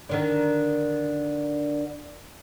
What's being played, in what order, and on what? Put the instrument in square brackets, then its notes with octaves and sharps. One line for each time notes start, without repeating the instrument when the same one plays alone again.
[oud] D3 D#3 D4